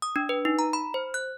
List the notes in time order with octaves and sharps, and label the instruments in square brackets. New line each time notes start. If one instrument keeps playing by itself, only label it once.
[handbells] D#6
D4
B4
D#4
A#5
B5
C5
F#6